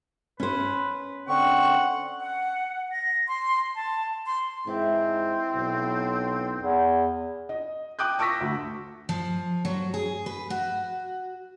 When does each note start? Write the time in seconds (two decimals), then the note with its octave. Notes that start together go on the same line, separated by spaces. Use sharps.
0.40 C#4 B4 C5
1.28 D3 C4 F#5 C#6
2.20 F#5
2.92 A#6
3.28 C6
3.75 A5
4.26 C6
4.67 G#2 E3 C4 E4 G4
5.55 B1
6.62 E2
7.49 D#5
7.99 G5 D6 D#6 F#6 G6
8.19 A5 C#6 D6 E6 A#6 B6
8.41 D2
9.09 F3
9.65 F#3
9.94 G#4
10.26 B4
10.50 F#4